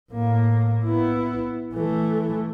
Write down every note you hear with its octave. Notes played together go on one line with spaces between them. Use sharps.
A2 A#3
B3 E4
E3 A3